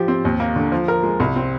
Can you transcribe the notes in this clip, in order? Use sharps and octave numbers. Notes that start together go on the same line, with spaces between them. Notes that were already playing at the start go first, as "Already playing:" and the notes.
Already playing: F3 G4
C4
D#2
A#3
D3
F3
A#4
G#3
C2
C4